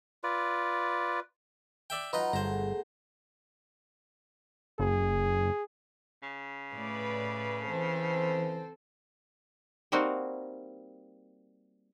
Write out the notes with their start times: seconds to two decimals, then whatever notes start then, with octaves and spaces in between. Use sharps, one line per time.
0.24 F4 B4 D5
1.90 D5 E5 G5
2.13 F#3 D#4 F4 B4 D#5
2.33 G1 A3 B3 G#4 C5 A#5
4.80 F#1 G#4
6.22 C#3
6.72 A2 B4 D5
7.66 E3 C4 A4 C5
9.92 G3 A#3 C4 D#4 F#4